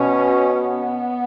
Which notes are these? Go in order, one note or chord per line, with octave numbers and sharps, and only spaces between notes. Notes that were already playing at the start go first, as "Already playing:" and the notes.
Already playing: B2 C#4
B3